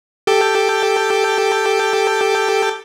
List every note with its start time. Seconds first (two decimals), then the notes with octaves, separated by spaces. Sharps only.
0.27 G4 A4 G5